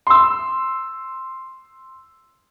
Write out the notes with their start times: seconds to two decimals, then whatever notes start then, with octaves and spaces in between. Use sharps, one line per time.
0.07 C6 E6